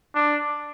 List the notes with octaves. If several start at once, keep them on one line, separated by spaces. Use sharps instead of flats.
D4